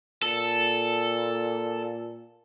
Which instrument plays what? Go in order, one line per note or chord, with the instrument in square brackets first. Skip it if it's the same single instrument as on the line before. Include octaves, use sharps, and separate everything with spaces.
[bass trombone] A#2 [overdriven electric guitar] A4